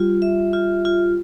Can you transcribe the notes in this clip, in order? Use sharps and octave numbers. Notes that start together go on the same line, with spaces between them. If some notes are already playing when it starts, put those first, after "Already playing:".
Already playing: G3 F4
E5
F4
F4